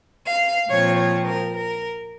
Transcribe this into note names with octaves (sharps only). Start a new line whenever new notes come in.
F5
A#2 F3 C4 C#5
C#5
A#4
A#4